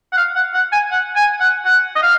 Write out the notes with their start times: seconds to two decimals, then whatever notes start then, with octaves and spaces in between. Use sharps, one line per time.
0.13 F#5
0.17 F5
0.35 F#5
0.54 F#5
0.73 G#5
0.91 F#5
1.16 G#5
1.40 F#5
1.65 F#5
1.95 D#5
2.03 F5